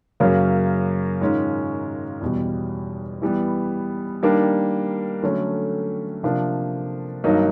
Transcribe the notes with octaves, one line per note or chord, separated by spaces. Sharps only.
F#2 C#3 F#3 A#3 C#4
G#2 D#3 G#3 C#4 F4
E2 B2 G3
E3 G3 B3
D#3 G3 A#3 D4
D3 F#3 A3 C#4
C3 F3 A#3 D4
G2 D#3 F#3 A#3 D#4